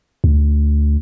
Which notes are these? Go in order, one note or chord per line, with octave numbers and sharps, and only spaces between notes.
D2